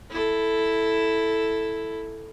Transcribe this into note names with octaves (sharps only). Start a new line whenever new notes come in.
E4 A4